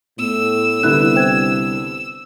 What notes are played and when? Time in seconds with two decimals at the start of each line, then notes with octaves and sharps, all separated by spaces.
0.19 A2 B3 E6
0.83 C2 D3 B3 E4 F#6
1.15 C5 G5 G#6